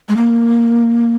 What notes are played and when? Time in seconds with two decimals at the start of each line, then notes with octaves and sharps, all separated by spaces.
0.09 G#3
0.17 A#3